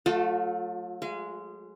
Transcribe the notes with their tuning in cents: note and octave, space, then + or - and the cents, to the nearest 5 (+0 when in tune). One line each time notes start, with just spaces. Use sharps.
F#3 -35 A3 +0 F4 +30
G#3 +0 F5 -40